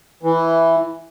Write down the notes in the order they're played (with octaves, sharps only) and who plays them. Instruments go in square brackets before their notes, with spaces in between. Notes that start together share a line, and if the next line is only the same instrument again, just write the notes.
[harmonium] E3